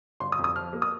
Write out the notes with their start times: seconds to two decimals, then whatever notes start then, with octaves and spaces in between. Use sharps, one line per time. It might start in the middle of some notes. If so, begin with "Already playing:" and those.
0.20 G1 C6
0.32 D#6
0.38 F2
0.44 D#6
0.56 F3 F6
0.73 A#3
0.82 D#6